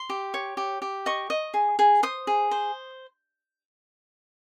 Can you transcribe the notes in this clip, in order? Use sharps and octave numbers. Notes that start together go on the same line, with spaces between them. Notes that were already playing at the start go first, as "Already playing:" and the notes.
Already playing: C6
G4
C#5
G4
G4
D#5 C#6
D#5
G#4
G#4
C5 D#6
G#4
C5